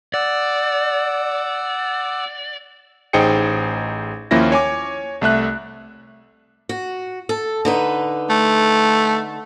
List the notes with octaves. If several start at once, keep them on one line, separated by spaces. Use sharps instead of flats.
D5 F#5 D6 E6
A1 D#4 G#4 C5 G5 C#7
D#2 F3 A#3 C#4 E4 A#6
C#5 G#5 D6
C2 A3 E5 F#6
F#4
A4
D3 D#4 B4
A3